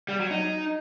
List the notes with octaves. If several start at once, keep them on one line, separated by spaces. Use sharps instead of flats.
G3
F#3
D#4